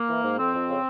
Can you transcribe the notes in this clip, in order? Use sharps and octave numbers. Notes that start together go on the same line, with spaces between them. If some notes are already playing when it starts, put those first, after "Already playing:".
Already playing: A#3
E3
G#2
F2 C4
F2
C#3